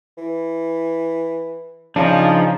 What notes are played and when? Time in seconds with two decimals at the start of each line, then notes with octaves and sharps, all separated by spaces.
0.17 E3
1.96 C#3 F3 D4 D#4 G#4